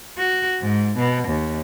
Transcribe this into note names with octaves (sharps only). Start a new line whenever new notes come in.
F#4
G#2
B2
D#2